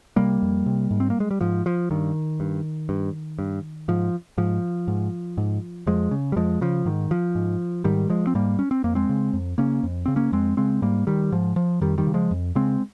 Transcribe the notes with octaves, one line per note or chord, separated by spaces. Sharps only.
C3 G3 A#3
F2
C3
G#2
C4
A#3
G#3
G3
G#2 F3
F3
G2 D#3
G2
G2
G2
G#2 F3
G#2 F3
G#2
G#2
F2 F3 G#3
C#3
G3
F2 F3 G#3
C#3 F3
G#2 D#3
F3
G#2
G#2 D#3 G3
F3 G#3
C4
G#2 G3 A#3
C#4
C4
F2 A#3
G#3 C4
C#3
F2
C#3 A#3 C#4
F2
C#3 C4
A#3 C#4
F2 G#3 C4
C#3 G#3 C4
G#2 G3 A#3
D#3 G3
G#2 F3
F3
F2 D#3 G3
D#3 G3
C#3
F3 G#3
F2
C#3 G#3 C4